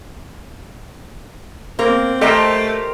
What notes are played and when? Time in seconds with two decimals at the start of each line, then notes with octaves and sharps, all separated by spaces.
1.79 A#3 C4 A#4
2.21 A3 G4 A4 A#4 C5 D#5 E5